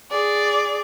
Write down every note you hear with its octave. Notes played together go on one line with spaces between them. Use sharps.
G#4 D5